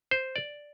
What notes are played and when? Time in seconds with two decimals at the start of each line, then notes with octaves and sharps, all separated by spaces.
0.11 C5
0.36 D5